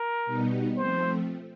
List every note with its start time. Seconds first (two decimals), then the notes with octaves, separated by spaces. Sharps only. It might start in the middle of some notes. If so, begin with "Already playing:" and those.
Already playing: A#4
0.26 B2 G3 B3 D#4
0.77 F3 A3 C4 C5